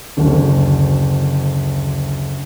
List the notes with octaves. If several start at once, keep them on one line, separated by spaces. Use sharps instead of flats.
F#1 D2